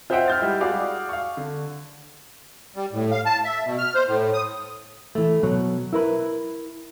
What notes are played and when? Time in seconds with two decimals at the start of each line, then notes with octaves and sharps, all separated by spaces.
0.10 F4 C5 D#5 E5 F#5 G5
0.28 F6 G6 A6
0.40 G3 G#3 E4
0.61 F#4 G#4 D5 F5 D6
1.09 F5 C#6
1.37 D3
2.76 G3
2.92 A2
3.11 F5
3.26 A5
3.44 E5
3.65 B2
3.78 F6
3.95 C5
4.07 A2
4.34 D#6
5.15 E3 A3
5.43 B2 F#3
5.93 E4 A#4 B4